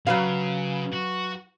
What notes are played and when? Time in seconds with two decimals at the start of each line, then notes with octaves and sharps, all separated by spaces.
0.07 C#3 F#3 B4 F5
0.93 F#4